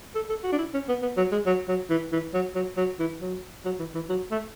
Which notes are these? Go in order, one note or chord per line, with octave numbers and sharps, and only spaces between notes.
A4
A4
F#4
D4
E4
C#4
B3
B3
F#3
G#3
F#3
F#3
E3
E3
F#3
F#3
F#3
E3
F#3
F#3
E3
E3
F#3
A3